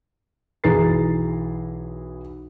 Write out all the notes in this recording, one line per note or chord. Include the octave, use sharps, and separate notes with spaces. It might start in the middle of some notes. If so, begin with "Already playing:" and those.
B1 E3 G#4 A#5 A6 C7